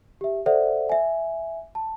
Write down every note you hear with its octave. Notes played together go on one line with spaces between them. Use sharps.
G4 E5
A4 C5 D5 E5 F#5
E5 G#5
A5